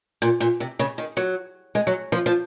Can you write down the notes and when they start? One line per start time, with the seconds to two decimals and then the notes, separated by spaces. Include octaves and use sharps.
0.22 A#2
0.40 A#2
0.60 C3
0.79 C#3
0.98 D#3
1.17 F#3
1.75 G#3
1.87 F#3
2.12 F3
2.26 F3